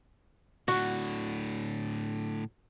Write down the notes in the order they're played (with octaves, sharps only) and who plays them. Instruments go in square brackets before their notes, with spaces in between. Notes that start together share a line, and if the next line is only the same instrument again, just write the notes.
[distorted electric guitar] A2 D3 [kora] F#4